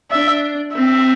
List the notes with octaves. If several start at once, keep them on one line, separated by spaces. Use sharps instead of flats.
D4 E5
C4 E5